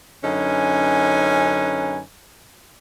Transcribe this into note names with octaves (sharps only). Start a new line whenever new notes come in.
F#2 D3 C#4 D#4 B4 G#5